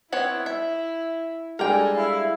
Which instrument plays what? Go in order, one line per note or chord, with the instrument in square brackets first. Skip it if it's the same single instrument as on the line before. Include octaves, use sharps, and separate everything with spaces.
[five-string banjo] B3 C4 C#5 [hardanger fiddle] E4
[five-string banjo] E5
[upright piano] G3 G#3 D4 [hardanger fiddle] A4 G#5 [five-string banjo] A#4 G5
[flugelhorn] E4 [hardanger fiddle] F5